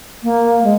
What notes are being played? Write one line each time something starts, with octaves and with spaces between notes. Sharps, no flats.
A#3
G#3